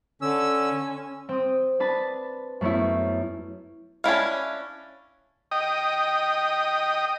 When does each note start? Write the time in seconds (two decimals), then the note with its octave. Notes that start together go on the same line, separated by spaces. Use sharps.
0.22 D3 C#4 E6
1.29 C4 D#6
1.80 D4 B4 A5
2.61 F#2 A3 B3 C#4 E4
4.04 C#4 D4 E4 F5
5.51 D#5 G5 D#6